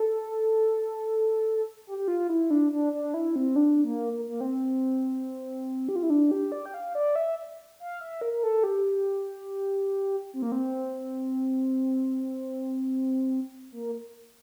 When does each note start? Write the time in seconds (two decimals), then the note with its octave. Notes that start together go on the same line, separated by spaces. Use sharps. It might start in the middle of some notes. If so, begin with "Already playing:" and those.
Already playing: A4
1.87 G4
1.98 G4
2.08 F4
2.29 E4
2.50 D4
2.72 D4
2.93 D4
3.14 E4
3.36 C4
3.56 D4
3.84 A#3
4.13 A#3
4.28 A#3
4.41 C4
5.89 G4
5.96 F4
6.03 E4
6.10 D4
6.31 G4
6.52 D5
6.66 G5
6.74 F5
6.95 D5
7.16 E5
7.80 F5
8.01 E5
8.21 A#4
8.33 A#4
8.43 A4
8.64 G4
10.34 C4
10.42 A#3
10.52 C4
13.72 A#3